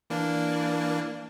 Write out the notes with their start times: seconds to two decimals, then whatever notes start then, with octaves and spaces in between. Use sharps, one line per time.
0.10 E3 A#3 D4